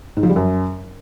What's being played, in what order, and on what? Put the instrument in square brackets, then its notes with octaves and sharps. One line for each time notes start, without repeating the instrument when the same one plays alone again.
[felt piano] G#2
F3
G3
F#2